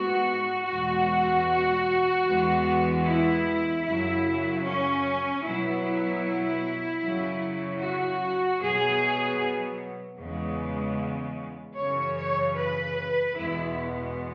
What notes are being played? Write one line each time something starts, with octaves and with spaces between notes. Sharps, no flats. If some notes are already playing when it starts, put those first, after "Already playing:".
Already playing: G#2 G#3 B3 F#4
E2 B2 G#3 F#4
E2 E3 G#3 B3
E4
F#2 C#3 F#3 E4
C#4
B2 F#3 B3 E4
F#2 C#3 F#3
F#4
B2 F#3 B3 G#4
E2 C#3 G#3 B3
F#2 C#3 E3 C#5
C#5
B4
E2 B2 G#3 B3 E4